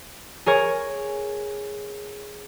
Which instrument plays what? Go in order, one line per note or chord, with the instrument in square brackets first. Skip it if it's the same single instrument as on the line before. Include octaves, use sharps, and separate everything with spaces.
[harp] G#4 A#4 C#5